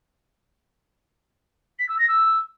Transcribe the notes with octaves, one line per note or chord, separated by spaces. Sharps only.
B6
E6
A#6
E6